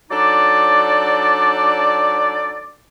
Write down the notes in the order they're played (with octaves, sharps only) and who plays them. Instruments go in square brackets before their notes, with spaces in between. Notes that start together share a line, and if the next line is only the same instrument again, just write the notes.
[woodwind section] F#3 D4 D#4 A4 D5